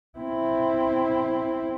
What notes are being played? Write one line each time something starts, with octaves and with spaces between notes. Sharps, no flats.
C4 E4